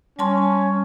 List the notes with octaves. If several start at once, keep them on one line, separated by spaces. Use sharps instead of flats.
G3 C#4 A5 C6